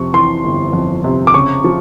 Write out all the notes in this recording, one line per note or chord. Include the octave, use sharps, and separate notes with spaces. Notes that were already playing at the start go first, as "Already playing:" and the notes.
Already playing: F2 C3 C#6
E3 C6
G1
F2
C3
D6
C#3 C#6
F3